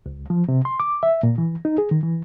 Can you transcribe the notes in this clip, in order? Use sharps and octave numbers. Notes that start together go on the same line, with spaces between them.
C#2
F3
C3
C6
D6
E5
A#2
E3
D#4
G#4
D#3
E3